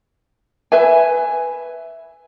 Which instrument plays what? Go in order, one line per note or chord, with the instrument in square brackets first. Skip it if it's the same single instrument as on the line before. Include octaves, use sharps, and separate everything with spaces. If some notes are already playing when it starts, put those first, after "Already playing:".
[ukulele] B4 E5 G#5